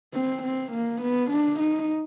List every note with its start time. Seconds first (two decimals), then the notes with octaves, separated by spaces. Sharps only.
0.13 C4
0.42 C4
0.72 A#3
1.01 B3
1.30 D4
1.59 D#4